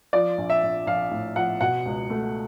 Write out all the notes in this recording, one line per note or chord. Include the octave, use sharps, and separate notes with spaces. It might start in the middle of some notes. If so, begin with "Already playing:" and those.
F3 D5
A#1
E5
A#1
A#1 F5
A2
F3 F#5
B2 F#5
C#2
A3